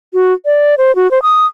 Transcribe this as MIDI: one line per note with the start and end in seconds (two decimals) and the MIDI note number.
0.13 0.33 66
0.45 0.75 74
0.78 0.95 72
0.95 1.10 66
1.11 1.22 72
1.22 1.46 87